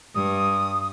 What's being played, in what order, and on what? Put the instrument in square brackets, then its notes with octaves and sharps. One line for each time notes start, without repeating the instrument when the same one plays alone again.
[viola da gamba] G2 [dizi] D#6